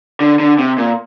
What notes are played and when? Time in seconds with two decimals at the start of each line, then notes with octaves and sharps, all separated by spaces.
0.21 D3
0.39 D3
0.59 C3
0.78 A#2